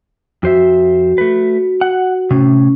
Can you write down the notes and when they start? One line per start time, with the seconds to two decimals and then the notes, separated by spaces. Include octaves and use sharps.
0.43 F2 F#4 C5 E5
1.18 A3 B4
1.81 F#5
2.30 A2 C3 C#4